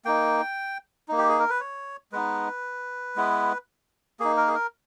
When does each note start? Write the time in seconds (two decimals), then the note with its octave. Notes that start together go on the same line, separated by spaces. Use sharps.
0.05 A#3 D#4 G5
1.08 A#3 D#4
1.18 G4
1.28 G#4
1.39 A#4
1.50 B4
1.60 C#5
2.12 G#3 B3 D#4 B4
3.16 G#3 B3 E4
4.20 A#3 D#4 G#4
4.37 A#4
4.48 G#4
4.55 A#4